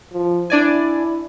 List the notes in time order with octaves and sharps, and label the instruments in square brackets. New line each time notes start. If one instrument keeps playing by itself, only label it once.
[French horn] F3
[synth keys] D4 D5 G#5 [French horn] E4